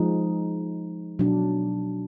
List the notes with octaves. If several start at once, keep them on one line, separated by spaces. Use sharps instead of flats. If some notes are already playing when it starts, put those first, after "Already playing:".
Already playing: F3 G#3 D#4
B2 F#3 D4